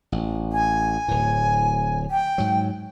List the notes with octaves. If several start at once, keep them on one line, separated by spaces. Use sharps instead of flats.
A1
G#5
D1 A2
G5
G#2 F#3